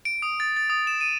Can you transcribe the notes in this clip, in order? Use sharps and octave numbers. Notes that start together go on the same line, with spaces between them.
D7
D#6
A6
A6
D#6
E7
D#7